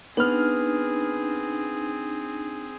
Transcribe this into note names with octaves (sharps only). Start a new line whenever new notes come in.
B3 C4 D4 D#4 G#4 F6